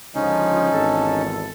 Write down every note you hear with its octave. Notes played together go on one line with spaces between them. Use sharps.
C#2 D3 F3 C#4 D#4
G#1 E2 A4